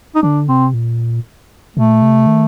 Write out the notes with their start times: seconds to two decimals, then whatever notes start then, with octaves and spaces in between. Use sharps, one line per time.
0.15 D#4
0.22 D3 D4
0.48 C3 C4
0.74 A#2
1.76 A#2 A3
2.02 C3
2.27 D#3